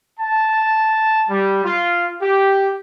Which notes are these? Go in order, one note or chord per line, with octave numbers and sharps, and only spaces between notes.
A5
G3
F4
G4